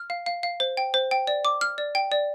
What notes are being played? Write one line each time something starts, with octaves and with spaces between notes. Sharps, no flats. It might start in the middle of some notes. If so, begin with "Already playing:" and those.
Already playing: F6
F5
F5
F5
C5
G5
C5
G5
D5
D6
F6
D5
G5
D5